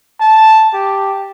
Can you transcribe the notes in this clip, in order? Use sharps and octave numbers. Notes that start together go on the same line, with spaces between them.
A5
G4